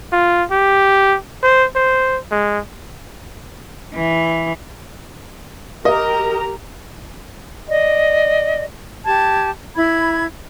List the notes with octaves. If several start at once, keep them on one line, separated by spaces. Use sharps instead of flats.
F4
G4
C5
C5
G#3
E3
G4 A#4 D#5 A#5
D5 D#5
G4 A5 G#6
E4 B5 G#6